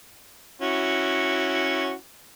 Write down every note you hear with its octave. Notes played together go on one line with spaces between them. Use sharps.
C#4 E4 F#4